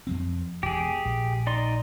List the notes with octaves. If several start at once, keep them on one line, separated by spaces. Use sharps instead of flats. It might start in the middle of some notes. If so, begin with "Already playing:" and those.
F2 F3 C4
E1 G4 G#4
A#1
D#4 D5 C6